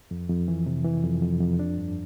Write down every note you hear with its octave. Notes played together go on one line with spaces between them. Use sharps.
F2
F2
E3
C3
E3
F2
F2
F2
D4
G2